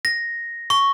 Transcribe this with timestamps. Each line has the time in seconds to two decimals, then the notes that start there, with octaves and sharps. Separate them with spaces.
0.05 A#6
0.70 C#6